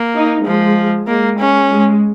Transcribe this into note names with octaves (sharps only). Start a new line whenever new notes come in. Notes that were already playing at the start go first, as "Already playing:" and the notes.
Already playing: A#3
D#4
F3 G#3
G#3 A#3
C#4
G#3